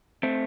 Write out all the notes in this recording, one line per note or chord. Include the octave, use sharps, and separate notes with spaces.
A3 C4